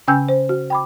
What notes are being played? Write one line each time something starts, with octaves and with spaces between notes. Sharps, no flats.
C#3 C#4 G5 G#5 E6 G6
C5
F#4
G5 B5 D6